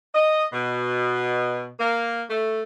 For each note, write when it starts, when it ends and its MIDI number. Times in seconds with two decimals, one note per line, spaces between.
0.15 0.47 75
0.53 1.69 47
1.80 2.23 58
2.30 2.62 57